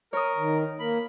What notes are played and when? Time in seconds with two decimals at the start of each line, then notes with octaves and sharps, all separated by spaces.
0.13 A#4 C#5 D#6
0.37 D#3
0.80 A#3 A#4 B5